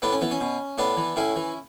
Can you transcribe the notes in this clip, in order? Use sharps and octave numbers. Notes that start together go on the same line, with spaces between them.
A2 B3 D4
C#4
E3 B3
C#4
B2
A2 B3 D4
E3
A2 C#4 E4
E3